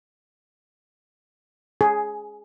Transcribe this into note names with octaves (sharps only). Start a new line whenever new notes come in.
G#4